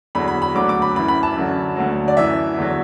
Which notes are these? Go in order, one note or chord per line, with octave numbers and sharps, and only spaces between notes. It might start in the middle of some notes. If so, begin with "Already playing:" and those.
E2 D3 F#3 B5
B5
B5
D2 D3 F#3 D6
D6
B5
F#2 E3 B5
B5
A5
F#2 D3 F#3
D2 D3 F#3
D5
F#2 E3 E5
E2 D3 F#3